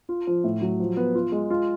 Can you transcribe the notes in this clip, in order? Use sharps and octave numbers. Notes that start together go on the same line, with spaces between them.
F4
F3
A2
F#3
F3
B3
F4
G#3
F4